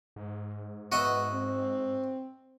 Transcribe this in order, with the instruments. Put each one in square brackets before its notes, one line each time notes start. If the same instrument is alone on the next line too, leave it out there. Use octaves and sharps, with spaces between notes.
[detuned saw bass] G#2
[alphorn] B3 [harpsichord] F#4 D#5 E5
[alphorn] C4